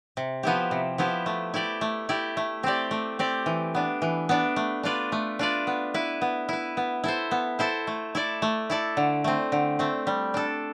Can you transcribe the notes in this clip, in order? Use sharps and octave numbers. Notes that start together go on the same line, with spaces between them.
C3
F3 B3 E4 G4
C3
F3 B3 E4 G4
A3
E4 G4 D5
A3
E4 G4 D5
A3
C4 G4 D5
A3
C4 G4 D5
E3
B3 D4
E3
B3 D4
A3
D4 F4 B4 D5
A3
D4 F4 B4 D5
B3
E4 B4
B3
E4 B4
B3
E4 A4 C5
B3
E4 A4 C5
A3
E4 A4 D5
A3
E4 A4 D5
D3
A3 C4
D3
A3 C4
G3
D4 A4